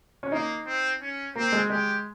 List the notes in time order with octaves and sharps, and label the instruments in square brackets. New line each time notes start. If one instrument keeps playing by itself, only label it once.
[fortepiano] C#4
[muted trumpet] A#3 [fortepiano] D#4
[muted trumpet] C4
C#4
[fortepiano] A#3 [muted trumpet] C4
[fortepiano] G#3
[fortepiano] G#3 [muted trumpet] G4